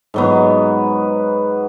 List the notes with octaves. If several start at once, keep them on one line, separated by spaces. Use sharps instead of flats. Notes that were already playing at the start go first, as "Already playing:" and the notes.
G#2 F#3 B3